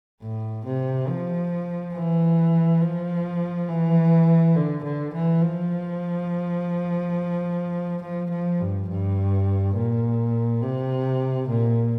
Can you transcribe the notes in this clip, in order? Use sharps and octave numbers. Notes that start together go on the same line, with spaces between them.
A2
C3
F3
E3
F3
E3
D3
D3
E3
F3
F3
F3
G2
G2
A#2
C3
A#2